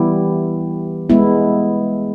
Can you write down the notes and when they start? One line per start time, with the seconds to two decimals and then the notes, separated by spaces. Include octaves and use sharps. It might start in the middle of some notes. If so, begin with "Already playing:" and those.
Already playing: E3 G3 B3 E4 G4
1.10 G#3 B3 E4